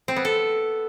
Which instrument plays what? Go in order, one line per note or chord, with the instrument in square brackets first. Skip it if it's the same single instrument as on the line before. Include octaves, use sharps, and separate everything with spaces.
[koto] C4
B3
A4